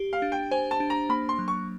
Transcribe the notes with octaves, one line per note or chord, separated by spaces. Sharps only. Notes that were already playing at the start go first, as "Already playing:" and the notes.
Already playing: G4
F5
D4
G5
C5 G#5
A5
D4
A#5
A#3 B5
C6
F#3
C#6